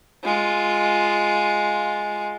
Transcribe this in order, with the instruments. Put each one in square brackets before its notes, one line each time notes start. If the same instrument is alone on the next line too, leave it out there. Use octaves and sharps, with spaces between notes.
[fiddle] G#3 F4